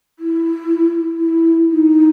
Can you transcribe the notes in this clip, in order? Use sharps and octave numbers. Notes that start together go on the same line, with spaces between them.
E4
E4
D#4